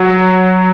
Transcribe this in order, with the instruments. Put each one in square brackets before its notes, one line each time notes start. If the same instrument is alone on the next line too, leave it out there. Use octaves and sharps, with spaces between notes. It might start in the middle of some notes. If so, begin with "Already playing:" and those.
Already playing: [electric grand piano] F#3